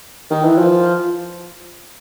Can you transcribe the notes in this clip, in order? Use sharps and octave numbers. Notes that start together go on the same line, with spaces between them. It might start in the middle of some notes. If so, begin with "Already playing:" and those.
D#3
E3
F3